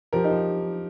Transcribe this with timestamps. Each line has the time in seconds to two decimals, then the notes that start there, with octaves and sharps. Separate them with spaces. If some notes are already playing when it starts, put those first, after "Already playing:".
0.13 F3 G4 A#4
0.24 D#4 G4
0.31 F3